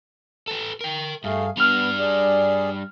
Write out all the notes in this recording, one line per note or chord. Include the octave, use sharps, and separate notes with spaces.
A4 B4
A#4 G5
G2 A3 G#4 F5
G3 B3 D4 F6 F7
G#4 D5